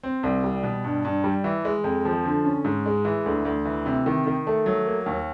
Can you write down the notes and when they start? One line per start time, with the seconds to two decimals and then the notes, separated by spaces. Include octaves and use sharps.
0.03 C4
0.23 C2
0.44 G3
0.64 B2
0.84 G2
1.05 G2
1.24 G3
1.44 E3
1.65 G#3
1.84 F2
2.05 F3
2.25 D3
2.45 C#4
2.64 G#2
2.86 G#3
3.05 E3
3.26 D2
3.45 D2
3.65 E3
3.86 C3
4.06 D#3
4.27 D#3
4.47 A3
4.66 F#3
4.87 A#3
5.06 D#2